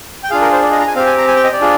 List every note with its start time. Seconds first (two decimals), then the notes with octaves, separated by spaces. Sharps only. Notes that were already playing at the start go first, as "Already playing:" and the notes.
0.23 G5
0.30 D4 F4 G#4 F5
0.41 A#4
0.52 C5
0.63 D5
0.71 D#5
0.79 A#5
0.88 G#5
0.95 C4 G4 F5
1.06 G#5
1.17 A#5
1.28 G#5
1.36 G5
1.44 D#5
1.53 D5
1.61 D4 F4 G#4